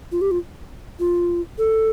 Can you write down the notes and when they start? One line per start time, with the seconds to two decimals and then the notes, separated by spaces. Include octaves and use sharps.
0.12 F4
0.21 G4
0.31 F4
1.00 F4
1.58 A4